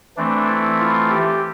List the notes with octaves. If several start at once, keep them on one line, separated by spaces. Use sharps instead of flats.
E3 A3 C4 D4
E4
F4
G4